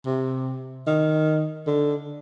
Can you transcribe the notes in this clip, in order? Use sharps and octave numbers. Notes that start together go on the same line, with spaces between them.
C3
D#3
D3